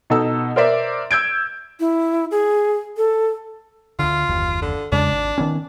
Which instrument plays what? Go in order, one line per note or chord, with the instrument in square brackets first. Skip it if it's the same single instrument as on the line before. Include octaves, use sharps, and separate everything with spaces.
[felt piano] B2 D#4 A4 E6
A#4 C5 D5 E5
E6 G6 G#6 D7
[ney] E4
G#4
A4
[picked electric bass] D2 D3 [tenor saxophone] F4
[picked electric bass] F#1 D#2
[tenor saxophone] D3
[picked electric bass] E2 C#3 G#3 [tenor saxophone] D4
[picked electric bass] G#1
D#3 B3 C#4